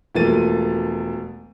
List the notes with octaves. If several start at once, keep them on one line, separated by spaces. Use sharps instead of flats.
E1 F3 A3 A#3 A6 D#7